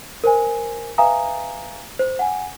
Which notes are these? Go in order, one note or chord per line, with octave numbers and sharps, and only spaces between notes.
A#4 C5 G#5
B4 E5 F5 G#5 A#5 D#6
C5
F#5 G#5